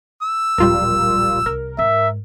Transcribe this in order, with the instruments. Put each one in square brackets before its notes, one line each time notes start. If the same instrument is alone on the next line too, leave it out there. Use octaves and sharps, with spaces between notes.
[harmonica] E6
[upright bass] D1 A#1 [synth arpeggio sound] G3 F4 A#4
[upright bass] C2 [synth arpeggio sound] A#4
[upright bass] G#2 [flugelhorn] E5